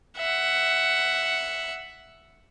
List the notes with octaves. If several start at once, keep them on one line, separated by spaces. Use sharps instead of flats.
E5 F#5